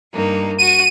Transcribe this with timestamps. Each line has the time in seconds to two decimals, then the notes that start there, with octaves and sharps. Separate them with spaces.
0.13 G2 A#3 D#4
0.58 F#4 D#7